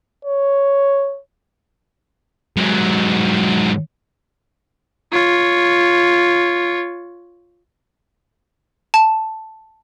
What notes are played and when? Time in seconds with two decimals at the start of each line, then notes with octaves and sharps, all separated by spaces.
0.25 C#5
2.57 G#2 F#3
5.12 F4 C#5
8.94 A5